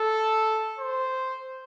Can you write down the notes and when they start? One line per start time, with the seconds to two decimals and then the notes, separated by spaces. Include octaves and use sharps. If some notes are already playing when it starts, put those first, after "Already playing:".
Already playing: A4
0.79 C5